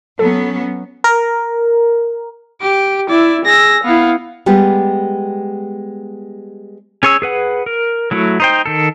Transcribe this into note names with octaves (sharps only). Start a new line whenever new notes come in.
F#3 B3 C#4 A4
A#4
G4 D7
E4 D5 E5
G#4 E6 A#6
B3 E4 F5
G3 G#3 B3 G4
C#4 G#4 C#5 G#5 E6
G#4 B4 F#5
A#4
F#3 A3 E4 F#4
D#4 C5 G5
D#3 A4